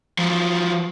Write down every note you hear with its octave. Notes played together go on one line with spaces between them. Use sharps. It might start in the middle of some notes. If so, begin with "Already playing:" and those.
F3 F#3